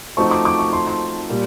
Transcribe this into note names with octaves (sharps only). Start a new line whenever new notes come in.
F3 A3 C4 D#4 F#4 C#6
D6
D6
C#6
C6
C6
A#2 G3